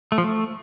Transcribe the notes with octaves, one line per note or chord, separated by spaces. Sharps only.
A3
F3
A3